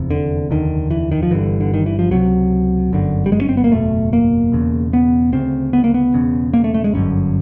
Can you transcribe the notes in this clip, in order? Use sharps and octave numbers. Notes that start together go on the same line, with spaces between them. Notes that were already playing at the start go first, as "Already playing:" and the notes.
Already playing: F1 E2 C3
D3
F1 D#2 D3 D#3
E3
D#3
F3
G1 G2 D3 E3
D3
D#3
E3
F3
C#2 C3 F#3
G1 F#2 D3
G3
G#3
C#4
C4
B3
A#3
F#1 E2 B2 A3
A#3
E1 E2 C#3
B3
D2 C#3 C4
B3
A#3
B3
E1 E2 C#3
A#3
A3
A3
G#3
G1 F#2 D3 C#4